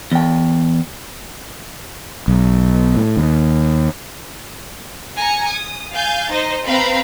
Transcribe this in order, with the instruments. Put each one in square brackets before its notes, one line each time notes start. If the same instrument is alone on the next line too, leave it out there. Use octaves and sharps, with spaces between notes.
[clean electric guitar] E2 G5
[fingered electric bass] B1
A2
D#2
[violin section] G#5 A#5 C#7
D#6
F5 G#5 G6 A6
D#4 C5 D#5
C4 B4 F5 A#5 B5